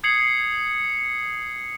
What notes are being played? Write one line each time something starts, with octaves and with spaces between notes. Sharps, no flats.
D#6 G#6 C7 C#7 F#7